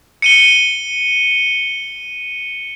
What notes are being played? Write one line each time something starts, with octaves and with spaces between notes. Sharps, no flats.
C#7 D#7 G7